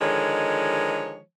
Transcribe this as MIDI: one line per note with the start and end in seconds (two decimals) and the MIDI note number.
0.01 1.20 50
0.01 1.20 51
0.01 1.20 53
0.01 1.20 56
0.01 1.20 73